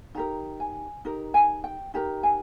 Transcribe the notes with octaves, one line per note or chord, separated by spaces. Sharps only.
D#4 G4 A#4 A#5
G#5
D#4 G4 A#4
G#5
G5
D#4 G4 A#4 A#5
G#5